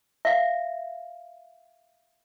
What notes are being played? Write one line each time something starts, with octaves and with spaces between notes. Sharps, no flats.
E5 F5